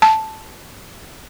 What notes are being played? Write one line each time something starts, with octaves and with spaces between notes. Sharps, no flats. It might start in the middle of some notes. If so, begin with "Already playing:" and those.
A5